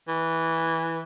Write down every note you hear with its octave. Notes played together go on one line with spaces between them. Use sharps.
E3